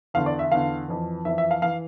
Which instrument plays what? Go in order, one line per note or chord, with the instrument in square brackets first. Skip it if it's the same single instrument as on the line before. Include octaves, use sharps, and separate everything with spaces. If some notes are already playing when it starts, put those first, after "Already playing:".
[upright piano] E2 D3 F5
D5
E5
E2 D3 F5
F2 E3
F2 E3 E5
E5
F5
E3 F5